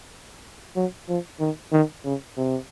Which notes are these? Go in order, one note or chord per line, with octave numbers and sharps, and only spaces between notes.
F#3
F3
D#3
D#3
C#3
C3